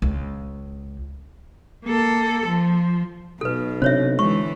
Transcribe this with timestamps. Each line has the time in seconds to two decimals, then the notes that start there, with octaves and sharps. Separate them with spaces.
0.02 C#2
1.85 A#3 A4
2.47 F3
3.41 B1 B2 A4 B4
3.82 C3 C4 D4 C5 C#5 E5
4.19 D3 E3 G#3 C#6